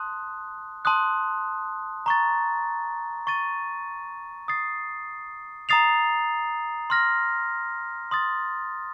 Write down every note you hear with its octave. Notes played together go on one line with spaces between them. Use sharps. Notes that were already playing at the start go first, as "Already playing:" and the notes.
Already playing: A5 C6 D#6 F#6
A5 C6 D#6 F#6
A#5 C#6 A6
C#6 A6 D#7
D#6 A6 C7
A#5 D#6 A6 C7 F7
C6 F6 A#6
C6 D#6 A6